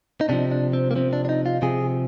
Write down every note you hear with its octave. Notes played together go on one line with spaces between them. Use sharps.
D#4
C3 F3 D4
D4
C4
A#3
C3 F3 C4
D4
D4
D#4
F4
C3 F3 G#4